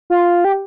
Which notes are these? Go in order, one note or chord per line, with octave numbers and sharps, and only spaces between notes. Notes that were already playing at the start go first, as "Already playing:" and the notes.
F4
G4